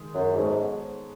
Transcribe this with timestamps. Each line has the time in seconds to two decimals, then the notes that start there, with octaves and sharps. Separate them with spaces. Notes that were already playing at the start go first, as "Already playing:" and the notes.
Already playing: D#3 G#3 D#4 G#4
0.14 F#2
0.36 G#2 G#3 B3 D#4 A4 C#5